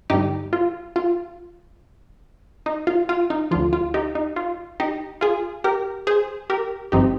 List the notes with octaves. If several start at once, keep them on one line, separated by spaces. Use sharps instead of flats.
G2 D3 G3 D#4 G4
F4
F4
D#4
F4
F4
D#4
D2 D3 F3 F4
F4
D#4 G4
D#4
F4
D#4 G4
F4 G#4
G4 A#4
G#4 C5
G4 A#4
G#1 G2 F3 C4 D#4 G4